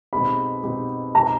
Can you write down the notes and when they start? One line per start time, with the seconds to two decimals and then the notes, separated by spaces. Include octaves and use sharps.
0.13 B2 G#3 C4 D#4 G4 B5
0.63 B2 G#3 C4 D#4 G4
1.15 B2 G#3 C4 D#4 G4 A#5